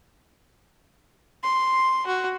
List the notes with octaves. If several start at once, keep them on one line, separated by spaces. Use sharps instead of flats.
C6
F#4